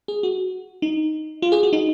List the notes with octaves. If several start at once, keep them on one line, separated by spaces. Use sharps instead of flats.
G#4
F#4
D#4
F4
G#4
F#4
D#4